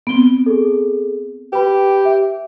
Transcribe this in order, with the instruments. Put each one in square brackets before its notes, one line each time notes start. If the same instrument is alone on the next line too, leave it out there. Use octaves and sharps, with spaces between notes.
[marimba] B3 C4 [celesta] D7 G7
[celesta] G#4 A4
[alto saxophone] G4 [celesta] B4 B5
[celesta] E5